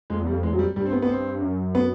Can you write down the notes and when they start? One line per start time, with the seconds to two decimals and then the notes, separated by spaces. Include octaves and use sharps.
0.10 F2 G#3
0.21 E2
0.27 G3
0.32 F2
0.43 E2 G#3
0.53 F2 F#3
0.59 G3
0.76 G2 G3
0.86 C4
0.92 B3
1.02 B3
1.09 C4
1.42 F#2
1.75 B3